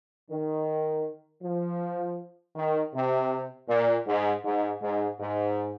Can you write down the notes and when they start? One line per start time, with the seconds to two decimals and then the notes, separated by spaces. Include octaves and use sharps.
0.29 D#3
1.43 F3
2.55 D#3
2.93 C3
3.69 A#2
4.06 G#2
4.44 G#2
4.82 G#2
5.19 G#2